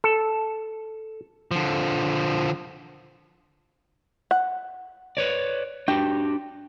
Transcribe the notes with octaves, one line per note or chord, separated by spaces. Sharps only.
A4
D3 F3
F#5
B4 C#5 D5
D4 F#4 G4 G5